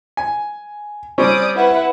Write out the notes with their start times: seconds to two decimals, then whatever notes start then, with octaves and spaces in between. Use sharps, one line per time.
0.17 G#5
1.18 G3 C4 C#4 D5 D#6 D7
1.55 E4 B4 F#5